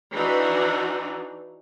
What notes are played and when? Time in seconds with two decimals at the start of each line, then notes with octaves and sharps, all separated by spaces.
0.13 E3 D4 D#4 F#4